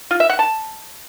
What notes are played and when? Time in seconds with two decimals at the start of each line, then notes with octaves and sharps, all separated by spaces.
0.11 F4
0.20 E5
0.29 F#5
0.39 A5